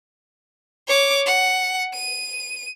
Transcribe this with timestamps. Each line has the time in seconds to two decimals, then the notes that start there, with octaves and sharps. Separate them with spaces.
0.88 C#5 D6
1.26 F#5
1.93 D#7